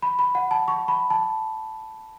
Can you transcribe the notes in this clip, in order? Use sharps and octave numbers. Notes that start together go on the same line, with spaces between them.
B5
B5
F#5
A5
C#6
B5
A5